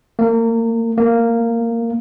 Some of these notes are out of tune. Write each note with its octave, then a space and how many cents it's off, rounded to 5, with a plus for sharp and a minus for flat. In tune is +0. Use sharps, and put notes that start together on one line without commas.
A#3 -30
A#3 -10